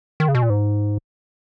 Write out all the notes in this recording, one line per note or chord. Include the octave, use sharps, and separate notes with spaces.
D#3
C#3
B2
A#2
G#2